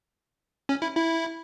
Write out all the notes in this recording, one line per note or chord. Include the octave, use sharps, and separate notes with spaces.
C#4
E4
E4